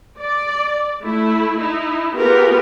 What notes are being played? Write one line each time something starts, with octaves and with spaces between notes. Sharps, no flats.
D5
A3 E4
D#4 E4
B3 F4 G4 G#4 A#4 B4